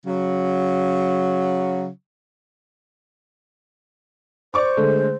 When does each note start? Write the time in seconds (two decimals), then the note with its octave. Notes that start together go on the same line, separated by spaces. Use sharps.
0.05 C#3 F#3
4.54 C5 D5 C#6 D6
4.77 D3 G#3 A3